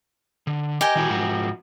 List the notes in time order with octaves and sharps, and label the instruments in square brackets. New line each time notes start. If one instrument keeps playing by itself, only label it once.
[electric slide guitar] D3
[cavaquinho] G4 A#4 G#5 [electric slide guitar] D#5
[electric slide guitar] D#3 E4 F#4
G#2 F3 F#4